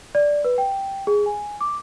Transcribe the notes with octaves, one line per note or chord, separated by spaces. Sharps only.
D5
B4
G5
G#4
G#5
D6